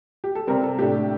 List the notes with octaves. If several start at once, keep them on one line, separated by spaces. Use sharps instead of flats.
G4
A4
C3 G3 C4 A#4
A4
A2 A3 D4 G4